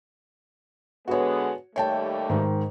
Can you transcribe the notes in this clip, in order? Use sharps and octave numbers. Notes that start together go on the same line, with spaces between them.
D3 G#3 B3 F#4 C#5
D#2 G3 A3 C#5 G5 A5
G#2 D#3